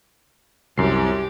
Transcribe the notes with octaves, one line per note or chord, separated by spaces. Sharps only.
C2 F#2 G4 C7